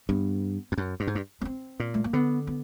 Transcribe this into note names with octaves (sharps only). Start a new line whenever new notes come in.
G2 B3
F2
F#2
G2
G#2
G2
B3
C4
A#2
A3
A#3
D3 B3
B3